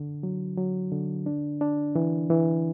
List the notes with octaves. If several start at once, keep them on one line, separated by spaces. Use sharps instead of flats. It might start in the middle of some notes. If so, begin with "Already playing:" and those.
Already playing: D3
F#3
F#3
D3
D4
D4
E3
E3